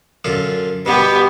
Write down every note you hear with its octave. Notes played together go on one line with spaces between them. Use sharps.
F#2 D3 F4
B2 G3 B3 G4